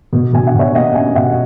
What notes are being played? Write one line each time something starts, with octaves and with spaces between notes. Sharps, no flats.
B2
B2 G#5
F#5
B2 C#5 E5
A#3 D#5 F#5
C#4 E5 G#5
B2 D#5 F#5